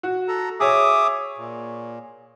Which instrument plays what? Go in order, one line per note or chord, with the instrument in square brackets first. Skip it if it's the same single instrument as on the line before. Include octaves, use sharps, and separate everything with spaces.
[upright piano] F#4
[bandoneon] A4 A#5
[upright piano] G#4 C#5 [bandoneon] E5 D6 D#6
[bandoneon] A#2